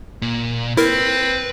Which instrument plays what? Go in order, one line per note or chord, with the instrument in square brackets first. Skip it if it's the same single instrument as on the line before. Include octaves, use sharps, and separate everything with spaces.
[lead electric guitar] A#2
[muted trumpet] C4 [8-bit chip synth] E4 A#4 [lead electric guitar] B4